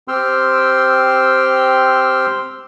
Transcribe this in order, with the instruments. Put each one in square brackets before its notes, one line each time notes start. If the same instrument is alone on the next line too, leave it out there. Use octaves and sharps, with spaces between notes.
[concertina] C4 G4 G5 C6 E6 F6